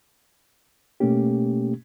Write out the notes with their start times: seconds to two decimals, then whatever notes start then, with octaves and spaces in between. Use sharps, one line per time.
1.00 B2 A3 A#3 C#4 G4